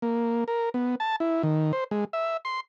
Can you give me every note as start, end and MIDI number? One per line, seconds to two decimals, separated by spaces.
0.02 0.44 58
0.48 0.69 70
0.74 0.95 59
1.00 1.16 81
1.20 1.42 64
1.43 1.72 51
1.73 1.84 72
1.91 2.05 56
2.13 2.37 76
2.45 2.60 84